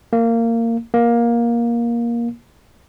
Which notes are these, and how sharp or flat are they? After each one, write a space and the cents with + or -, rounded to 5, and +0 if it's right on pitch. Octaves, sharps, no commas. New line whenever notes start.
A#3 -20
A#3 +15